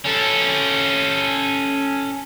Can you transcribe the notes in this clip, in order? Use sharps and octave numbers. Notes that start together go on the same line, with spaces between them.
C#4 A4